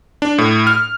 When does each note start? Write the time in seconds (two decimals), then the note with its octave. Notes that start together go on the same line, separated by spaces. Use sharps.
0.22 D4
0.38 A2
0.67 F6